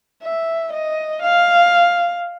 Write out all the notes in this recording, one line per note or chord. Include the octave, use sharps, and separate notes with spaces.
E5
D#5
F5